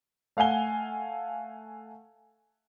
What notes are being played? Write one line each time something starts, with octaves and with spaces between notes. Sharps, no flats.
A3 F5 F#5 G#5 G7